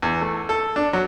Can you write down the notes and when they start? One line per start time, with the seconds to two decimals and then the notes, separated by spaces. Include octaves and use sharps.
0.02 E2
0.21 A3
0.49 A4
0.76 D4
0.93 F#3